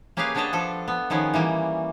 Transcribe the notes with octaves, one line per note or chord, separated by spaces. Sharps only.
A#3 C#4 G4 G#4 B4 F5
B3 D4 C#5 D#5 A5 A#5
F3 D4 A4
B3
D#3 F3 B3 C#4 G#4
E3 G3 A#3